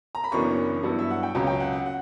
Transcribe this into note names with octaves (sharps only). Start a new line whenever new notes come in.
A#5
B5
F#1 F#2 E3 B3 D4 C#6
G2 F#3 B3 E4
E5
F#5
G5
C#2 C#3 F#3 C#4 A#5
G5
F#5
F#5
F#5